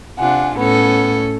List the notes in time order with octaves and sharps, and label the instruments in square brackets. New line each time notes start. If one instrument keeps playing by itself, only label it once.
[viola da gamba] C3 D4 F4 [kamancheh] F#5 G#5
[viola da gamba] A2 C#4 A4 [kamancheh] B3